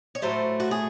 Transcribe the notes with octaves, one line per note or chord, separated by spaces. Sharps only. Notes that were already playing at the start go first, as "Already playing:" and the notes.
C#5
A2 F#3 A3 C5
F#4
G#4